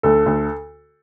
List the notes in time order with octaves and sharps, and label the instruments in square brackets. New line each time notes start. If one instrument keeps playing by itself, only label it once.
[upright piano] D2 [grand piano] A4
[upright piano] D2